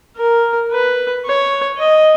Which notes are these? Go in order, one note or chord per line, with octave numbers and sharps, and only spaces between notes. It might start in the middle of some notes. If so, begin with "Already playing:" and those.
A#4
B4
C#5
D#5